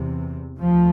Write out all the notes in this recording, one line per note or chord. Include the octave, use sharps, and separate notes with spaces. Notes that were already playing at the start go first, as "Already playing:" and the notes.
Already playing: E2 C3
D2 F3